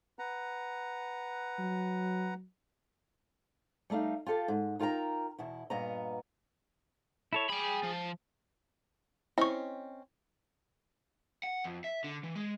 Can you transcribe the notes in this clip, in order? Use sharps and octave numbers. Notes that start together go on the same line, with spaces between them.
B4 F#5 A#5
F#3
G3 A3 D#4 F5
F4 G4 A4 F5
G#2
D#4 F4 A#4 G5 A#5
E2 B2 E4
G2 A#2 B3 D#5 A#5
E4 A4 C#5
G#4 G5 B5
F3
C4 C#4 E4 D#5 C#6
F#5
F2
E5
D3
E3
G#3